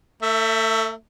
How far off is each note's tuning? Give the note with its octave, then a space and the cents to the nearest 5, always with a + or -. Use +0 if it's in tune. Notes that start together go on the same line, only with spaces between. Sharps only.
A3 +35 E5 +0